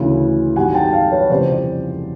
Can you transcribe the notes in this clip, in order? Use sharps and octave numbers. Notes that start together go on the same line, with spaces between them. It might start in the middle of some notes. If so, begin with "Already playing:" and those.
Already playing: D2 C#3 E3
G#1 F#2 D#3 G3 F#5 G#5
G5 A5
F5 G5
B4 C#5
F1 F2 C#3 E3 G3 C5 D5